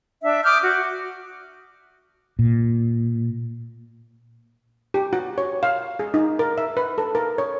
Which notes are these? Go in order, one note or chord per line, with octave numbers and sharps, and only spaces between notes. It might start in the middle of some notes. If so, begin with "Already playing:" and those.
D4 E5
D6 D#6 F6 G6
F#4
A#2
G4
F#4
C#5
F5
G#4
D#4
A#4
E5
B4
A4
A#4
C#5